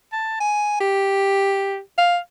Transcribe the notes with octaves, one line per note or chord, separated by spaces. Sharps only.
A5
G#5
G4
F5